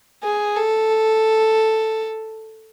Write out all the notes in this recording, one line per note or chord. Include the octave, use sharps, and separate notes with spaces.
G#4
A4